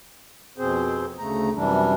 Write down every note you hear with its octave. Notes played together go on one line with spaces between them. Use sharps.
F2 B2 C4 G#4 C5
D2 C#3 A3 A#5
F#2 C3 E3 G3 D4